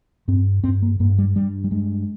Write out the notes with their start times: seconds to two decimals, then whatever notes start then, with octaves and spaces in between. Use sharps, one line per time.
0.28 G2 C4
0.64 G2 C4
0.82 A#3
1.00 G2 A#3
1.18 G3
1.36 G2 G3
1.64 G3
1.71 G2 G#3